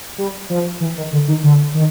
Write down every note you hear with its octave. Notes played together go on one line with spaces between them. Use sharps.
G3
F3
E3
D#3
D3
D#3
D3
D#3